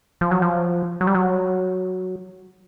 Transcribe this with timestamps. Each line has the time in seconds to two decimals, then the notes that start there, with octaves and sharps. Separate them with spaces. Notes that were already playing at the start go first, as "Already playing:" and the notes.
0.21 F3
0.31 F#3
0.42 F3
1.01 F#3
1.07 G3
1.15 F#3